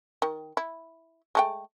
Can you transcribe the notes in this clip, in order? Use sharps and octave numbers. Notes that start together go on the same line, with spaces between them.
D#3
E4
G#3 A3 G5